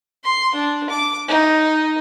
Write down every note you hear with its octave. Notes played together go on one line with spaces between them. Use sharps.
C6
D4
D6
D#4